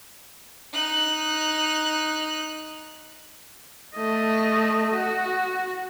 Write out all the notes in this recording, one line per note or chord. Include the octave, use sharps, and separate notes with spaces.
D#4 F#6
A3 D#5
F#4